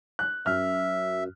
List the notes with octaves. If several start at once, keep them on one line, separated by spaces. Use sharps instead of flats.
F#6
F#2 E5 F6